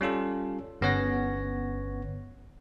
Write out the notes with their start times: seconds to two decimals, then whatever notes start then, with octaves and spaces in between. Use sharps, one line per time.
0.01 G3 C#4 F4 A4
0.81 G1 B3 C#4 C#5 F#5 A#6